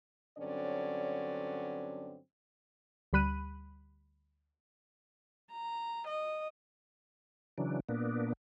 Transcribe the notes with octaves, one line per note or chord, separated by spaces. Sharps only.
G2 D3 F#3 C4 C#4 D5
D2 G3 B5 F#6 D#7
A#5
D#5
C#3 E3 F#3 D4
A#2 A#3 B3 D4